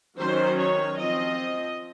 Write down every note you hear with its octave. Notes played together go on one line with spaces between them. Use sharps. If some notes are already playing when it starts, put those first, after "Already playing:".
D#3 F#3 C#4 C5
C#5
F3 C4 D#5